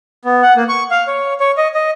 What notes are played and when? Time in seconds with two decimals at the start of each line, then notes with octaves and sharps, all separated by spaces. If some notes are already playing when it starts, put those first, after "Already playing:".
0.25 B3
0.42 F#5
0.56 A#3
0.69 C#6
0.91 F5
1.07 C#5
1.40 C#5
1.57 D#5
1.74 D#5